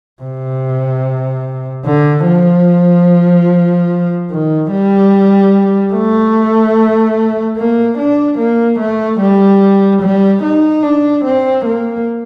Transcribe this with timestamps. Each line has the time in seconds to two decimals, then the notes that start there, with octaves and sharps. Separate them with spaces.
0.22 C3
1.85 D3
2.26 F3
4.30 D#3
4.71 G3
5.94 A3
7.57 A#3
7.97 D4
8.38 A#3
8.79 A3
9.20 G3
10.02 G3
10.43 D#4
10.83 D4
11.24 C4
11.65 A#3